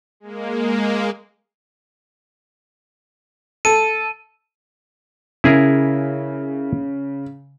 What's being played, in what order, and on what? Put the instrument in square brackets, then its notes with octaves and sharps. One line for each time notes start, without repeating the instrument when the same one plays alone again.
[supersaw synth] G#3 A#3
[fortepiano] A4 [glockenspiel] D#7
[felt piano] C#3 [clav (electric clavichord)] E4 G#4 A#4